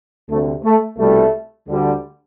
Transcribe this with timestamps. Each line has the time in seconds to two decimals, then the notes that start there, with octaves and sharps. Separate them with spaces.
0.28 D2 C3 G3 A3
0.64 A3
0.98 C2 B2 G3 A3
1.68 D2 D3 G3